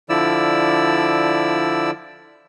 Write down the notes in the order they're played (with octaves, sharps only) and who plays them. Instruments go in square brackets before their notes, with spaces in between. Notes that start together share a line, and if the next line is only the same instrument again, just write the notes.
[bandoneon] D3 F3 E4 D5 E6